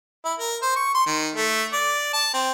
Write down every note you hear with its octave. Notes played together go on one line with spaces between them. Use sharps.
E4
A#4
C5
C#6
C6
D#3
A3
D5
A5
C4